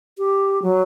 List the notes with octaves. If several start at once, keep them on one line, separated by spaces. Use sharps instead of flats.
G4
F#3